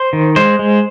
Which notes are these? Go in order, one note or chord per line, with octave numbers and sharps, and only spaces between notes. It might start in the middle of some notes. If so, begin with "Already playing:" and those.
Already playing: C5
D#3
G#3 C5
G#3